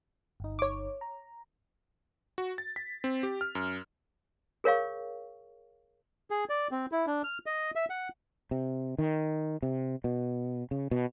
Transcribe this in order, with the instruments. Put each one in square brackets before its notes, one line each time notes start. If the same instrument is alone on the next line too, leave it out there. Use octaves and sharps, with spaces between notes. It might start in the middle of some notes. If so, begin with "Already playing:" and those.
[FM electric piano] G1 D#4
[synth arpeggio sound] C#5 D6
[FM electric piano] A#5
[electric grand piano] F#4
A6
B6
C4
G4
F6
F#2
[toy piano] G#4 A#4 C#5 F5 C#6
[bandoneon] G#4
D5
C4
E4
D4
F6
D#5
E5
F#5
[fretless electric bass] C3
D#3
C3
B2
C#3
B2